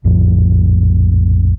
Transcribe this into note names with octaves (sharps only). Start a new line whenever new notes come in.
A#1 F2 A2 F3